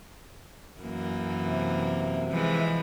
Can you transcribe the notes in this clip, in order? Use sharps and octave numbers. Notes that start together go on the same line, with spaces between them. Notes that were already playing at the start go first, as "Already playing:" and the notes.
F#2 E3 A#3
C3
E3 F3 G#3